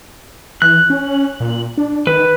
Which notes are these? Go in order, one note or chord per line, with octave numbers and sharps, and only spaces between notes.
E3 F#6
C#4
A#2
D4
D#3 B4